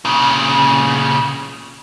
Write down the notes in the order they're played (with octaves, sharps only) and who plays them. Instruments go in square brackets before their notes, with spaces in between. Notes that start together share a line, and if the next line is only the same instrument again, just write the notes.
[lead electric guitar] A#2 C#3